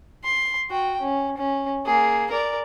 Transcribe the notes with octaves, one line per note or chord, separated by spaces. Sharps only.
C6
F#4 G5
C#4
C#4
A#3 G#4
A#4 D5